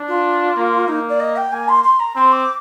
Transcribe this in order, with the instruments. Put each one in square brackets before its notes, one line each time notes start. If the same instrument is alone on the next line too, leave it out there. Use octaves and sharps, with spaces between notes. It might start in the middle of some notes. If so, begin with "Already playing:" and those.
Already playing: [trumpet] D4
[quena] F4
[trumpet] A#3
[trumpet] A#3 [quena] D#4
[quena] D5
D#5
G5
[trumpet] A#3 [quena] G#5
[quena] C6
C6
A#5
[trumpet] C4 [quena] C6
[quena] D6